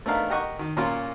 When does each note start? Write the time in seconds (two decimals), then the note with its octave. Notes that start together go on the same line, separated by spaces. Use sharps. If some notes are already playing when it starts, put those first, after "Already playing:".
0.06 A3 B3 D4 D#4 A#4 F5
0.30 G4 A#4 D#5 F#5 C#6
0.59 D#3
0.77 A#2 A#3 C#4 F4 A#4 C6